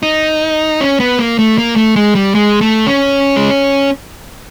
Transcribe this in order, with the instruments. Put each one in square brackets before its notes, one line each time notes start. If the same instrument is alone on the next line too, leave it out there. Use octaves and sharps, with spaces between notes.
[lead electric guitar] D#4
C#4
B3
A#3
A3
A#3
A3
G#3
G3
G#3
A3
C#4
G#3